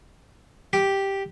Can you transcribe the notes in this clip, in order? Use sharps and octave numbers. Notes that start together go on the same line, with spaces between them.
G4